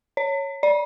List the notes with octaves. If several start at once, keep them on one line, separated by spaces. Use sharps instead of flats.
C#5
D5